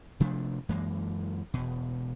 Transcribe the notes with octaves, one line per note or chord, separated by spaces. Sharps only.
C3 F3 A3 D4
F#2 E3 G#3 A#3
E1 B2